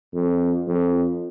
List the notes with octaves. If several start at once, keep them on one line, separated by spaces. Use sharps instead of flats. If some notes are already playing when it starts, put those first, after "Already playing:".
F2
F2